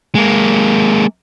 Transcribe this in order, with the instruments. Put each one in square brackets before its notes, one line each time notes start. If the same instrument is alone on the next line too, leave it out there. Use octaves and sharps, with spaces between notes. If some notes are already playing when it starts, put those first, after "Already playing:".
[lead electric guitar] G#3 A#3